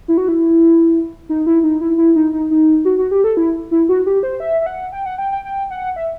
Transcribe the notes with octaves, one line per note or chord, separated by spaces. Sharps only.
E4
F#4
E4
D#4
E4
D#4
E4
E4
D#4
D#4
D#4
F#4
F#4
G4
A4
E4
E4
F#4
G4
C5
E5
E5
F#5
G5
F#5
G5
G5
G5
F#5
E5